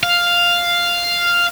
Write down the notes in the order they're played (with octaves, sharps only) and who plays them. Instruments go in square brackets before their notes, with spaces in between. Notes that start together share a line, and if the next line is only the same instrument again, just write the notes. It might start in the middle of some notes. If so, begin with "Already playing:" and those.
[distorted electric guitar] F5